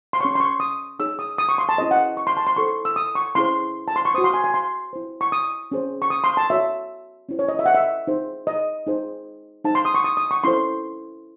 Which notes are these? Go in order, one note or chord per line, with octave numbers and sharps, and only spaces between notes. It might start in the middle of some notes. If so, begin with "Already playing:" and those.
C6
C#4 G#4 C#5 C#6
C6
C#6
D#6
D#4 G#4 C#5 E6
D#6
D#6
C#6
C6
A5
C#4 E4 G#4 C5 D#5
F#5
C#6
C6
A5
C6
E4 A4 C5 C#6
E6
D#6
C#6
C#4 E4 G#4 C5 C6
A5
C6
C#6
F#4 C5 D#6
C6
G#5
G#5
C6
E4 C5
C#6
D#6
C#4 G#4 C5
C#6
D#6
C6
A5
F#4 C#5 E5
C#4 E4 C5
C#5
D#5
E5
F#5
E5
D#4 G#4 C5
D#5
D#4 G#4 C5
D#4 G#4 C5 A5
C6
D#6
C#6
D#6
D#6
C#6
C#4 E4 A4 C5 C6